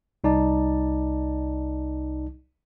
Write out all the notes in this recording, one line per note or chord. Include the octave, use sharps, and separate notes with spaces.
C2 D#4 D5 A5